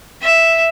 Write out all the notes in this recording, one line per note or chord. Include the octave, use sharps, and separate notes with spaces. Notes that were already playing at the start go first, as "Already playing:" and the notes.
E5